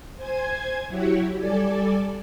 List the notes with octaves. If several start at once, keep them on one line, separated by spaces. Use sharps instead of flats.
C5 G#5 G#6
F#3 E4 F#4 G4 C#5
G3 A4 D5 G#5